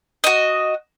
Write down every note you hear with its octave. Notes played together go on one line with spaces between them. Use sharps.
F#4 D#5